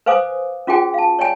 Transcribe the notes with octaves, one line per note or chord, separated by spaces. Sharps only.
B4 C5 F5 G#5 D6 D#6
C#4 F4 F#4 G#4 G5 G#5
F5 A5
C#5 D5 G5 G#5